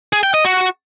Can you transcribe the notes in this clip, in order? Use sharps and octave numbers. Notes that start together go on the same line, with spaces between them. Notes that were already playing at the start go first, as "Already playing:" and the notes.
G#4
G5
D#5
F#4